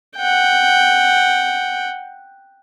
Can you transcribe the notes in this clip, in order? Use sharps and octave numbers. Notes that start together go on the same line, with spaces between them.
F#5 G5